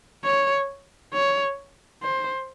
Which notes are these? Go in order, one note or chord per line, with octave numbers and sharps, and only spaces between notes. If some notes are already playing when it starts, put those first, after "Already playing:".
C#5
C#5
C5